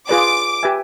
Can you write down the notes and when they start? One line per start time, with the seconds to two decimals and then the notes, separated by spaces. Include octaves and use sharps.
0.09 F4 G#4 B4 D5 D6
0.63 G4 B4 E5 G#5